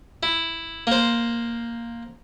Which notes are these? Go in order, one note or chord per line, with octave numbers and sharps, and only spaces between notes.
E4
A#3 C5